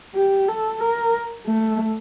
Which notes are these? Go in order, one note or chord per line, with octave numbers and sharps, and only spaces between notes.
G4
A4
A#4
A3